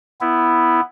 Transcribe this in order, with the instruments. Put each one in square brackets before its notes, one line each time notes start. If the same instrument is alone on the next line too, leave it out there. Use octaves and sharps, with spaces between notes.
[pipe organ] B3 E4